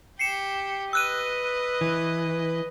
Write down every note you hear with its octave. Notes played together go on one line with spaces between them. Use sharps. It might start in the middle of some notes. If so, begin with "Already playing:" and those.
G4 C7 C#7 E7
B4 D#5 E6 F#6 D#7
E3